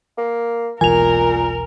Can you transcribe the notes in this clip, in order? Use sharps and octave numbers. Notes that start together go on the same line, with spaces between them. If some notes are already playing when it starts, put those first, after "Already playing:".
A#3
E1 B1 A#2 E3 A#4 G#5 F7